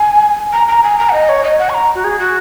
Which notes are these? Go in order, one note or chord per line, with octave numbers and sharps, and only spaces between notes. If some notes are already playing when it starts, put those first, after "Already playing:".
Already playing: G#5
A#5
A#5
G#5
A#5
F#5
D#5
C#5
D#5
F#5
C#6
A#5
F#4
G#4
F#4